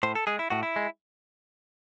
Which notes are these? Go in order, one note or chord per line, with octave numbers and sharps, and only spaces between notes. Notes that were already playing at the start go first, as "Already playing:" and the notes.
A2 C5
A4
G#3 G#4
E4
A2 F#4
E4
G#3